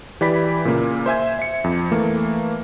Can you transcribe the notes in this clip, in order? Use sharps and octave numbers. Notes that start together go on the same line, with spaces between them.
E3 G4 D5 B5 B6
A#2 C#3 A#3
C5 E5 G#5 G#6
E5 C#7
F2
E3 A3 A#3